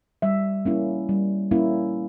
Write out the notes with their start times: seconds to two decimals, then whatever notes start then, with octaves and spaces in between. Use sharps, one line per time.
0.22 G3 E5
0.65 A#3 C#4 E4
1.09 G3
1.51 A#3 C#4 E4